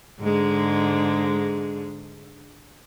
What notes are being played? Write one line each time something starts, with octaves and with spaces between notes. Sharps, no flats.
G#2 D3 G#3